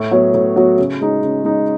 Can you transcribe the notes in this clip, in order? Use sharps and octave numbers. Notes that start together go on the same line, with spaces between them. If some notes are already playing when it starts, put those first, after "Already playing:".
Already playing: A2
F#3 B3 F#4 C#5
A2
F#3 B3 F#4 C#5
C#3
G#3 D#4
C#3
G#3 D#4